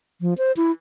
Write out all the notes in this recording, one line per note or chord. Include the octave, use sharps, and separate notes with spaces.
F3
C5
E4